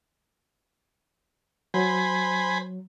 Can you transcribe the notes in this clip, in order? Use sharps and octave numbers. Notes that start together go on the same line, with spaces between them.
F#3 C5 G#5 B5